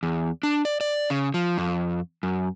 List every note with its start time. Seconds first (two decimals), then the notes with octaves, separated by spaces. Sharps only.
0.03 E2
0.43 D4
0.65 D5
0.81 D5
1.10 C#3
1.34 F3
1.58 F2
2.23 F#2